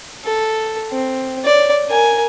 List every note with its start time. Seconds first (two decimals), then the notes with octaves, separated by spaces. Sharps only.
0.24 A4
0.92 C4
1.45 C#5 D5
1.89 A#4 G#5